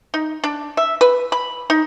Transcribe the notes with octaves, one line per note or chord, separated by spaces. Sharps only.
D#4
D4
E5
B4
B5
D#4